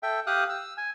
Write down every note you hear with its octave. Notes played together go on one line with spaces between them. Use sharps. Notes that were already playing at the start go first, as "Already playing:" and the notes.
A4 E5 G5
G4 F5 D#6 F#6
E6
G#5